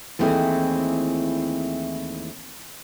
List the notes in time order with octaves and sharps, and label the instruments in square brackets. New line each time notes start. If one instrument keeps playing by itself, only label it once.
[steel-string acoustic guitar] D#2 E3 A3 C4 E4 G#4